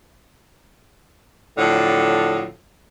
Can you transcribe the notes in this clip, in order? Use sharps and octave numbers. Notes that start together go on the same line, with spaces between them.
A2 D3 F3 F#3